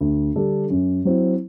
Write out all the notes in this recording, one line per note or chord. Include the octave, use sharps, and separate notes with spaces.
D2
D3 G3 D4 A4
F#2
F#3 C4 E4